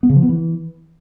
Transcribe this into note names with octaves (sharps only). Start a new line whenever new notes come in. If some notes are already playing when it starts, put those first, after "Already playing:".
B3
C#3
F3
B3
E3